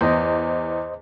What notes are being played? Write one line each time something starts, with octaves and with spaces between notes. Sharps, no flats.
E2 C5 D#5